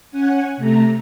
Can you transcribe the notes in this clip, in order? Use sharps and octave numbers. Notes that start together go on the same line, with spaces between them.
C#4 F#5 G#5
C3 A3 A#5